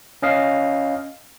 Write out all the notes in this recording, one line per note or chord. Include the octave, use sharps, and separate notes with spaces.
C#4 D#5 F5